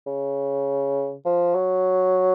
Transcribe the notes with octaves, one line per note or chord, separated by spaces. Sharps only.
C#3
F3
F#3